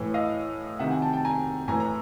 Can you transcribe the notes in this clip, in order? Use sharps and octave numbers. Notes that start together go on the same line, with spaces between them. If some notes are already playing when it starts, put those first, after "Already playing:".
Already playing: A2 E3
D#5 F5
C3 D#3 E5 F#5
F#5 G#5
G5 A5
G5 A5
G#5 A#5
A2 E3 G#5 A#5
A#5